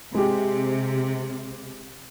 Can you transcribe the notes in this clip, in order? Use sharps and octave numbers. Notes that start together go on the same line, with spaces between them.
C3 G#3 G4